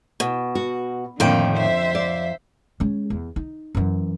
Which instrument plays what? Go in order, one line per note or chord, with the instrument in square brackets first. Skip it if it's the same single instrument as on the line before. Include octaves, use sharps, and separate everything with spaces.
[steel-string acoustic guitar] B2
[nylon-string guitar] F#4
[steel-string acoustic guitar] F2 G5 [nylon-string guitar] A2 D#3 [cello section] D3 F3 A#3
[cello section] C5 E5
[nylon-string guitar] D5
[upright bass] G#3 C#4
E2
D#4
F#2 E3